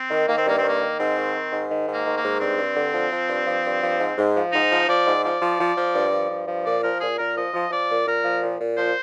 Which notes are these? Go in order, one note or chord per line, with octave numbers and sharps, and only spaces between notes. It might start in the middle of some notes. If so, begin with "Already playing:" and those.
Already playing: C4
D#3
D#3 A#3
C4
G2 A#3
C4
D#3 A#3
D#3
G#2 C4
D#3
D#3
G#2
D#3
G#2
A#3
D#3
A#3
G#2
G2 C4
G2
D3
F3
F3
G2
F3
G2
F3
G#2
G#2
F3
G#2 D#4
F3
F3 D5
G#2
F3 D5
F3
F3
F3
G2
F3
G2
F3
A#2 D5
F3 A#4
A#2 G#4
A#2 A#4
F3 D#5
F3
F3 D5
A#2
A#2 A#4
F3
A#2
A#2
F3 C5